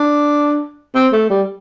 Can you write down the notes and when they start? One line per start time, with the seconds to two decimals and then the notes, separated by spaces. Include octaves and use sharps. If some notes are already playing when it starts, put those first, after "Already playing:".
Already playing: D4
0.95 C4
1.12 A3
1.30 G3